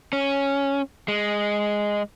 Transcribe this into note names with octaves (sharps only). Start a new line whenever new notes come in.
C#4
G#3